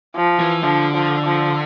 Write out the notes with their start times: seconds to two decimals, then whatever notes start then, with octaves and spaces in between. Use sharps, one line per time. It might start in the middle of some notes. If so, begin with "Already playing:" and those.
0.16 F3
0.39 E3
0.63 D3 F3
0.94 F3
1.26 F3